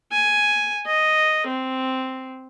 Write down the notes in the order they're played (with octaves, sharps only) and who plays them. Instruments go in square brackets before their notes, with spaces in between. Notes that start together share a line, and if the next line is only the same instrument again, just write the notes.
[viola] G#5
D#5
C4